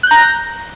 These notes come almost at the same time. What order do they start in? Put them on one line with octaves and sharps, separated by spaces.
F#6 G6 A#5 A#6